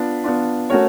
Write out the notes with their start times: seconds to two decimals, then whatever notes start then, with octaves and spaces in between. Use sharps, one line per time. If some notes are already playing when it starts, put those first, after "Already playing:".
Already playing: B3 D4 F4
0.24 B3 D4 F4
0.70 A3 C#4 F#4 A#4 C#5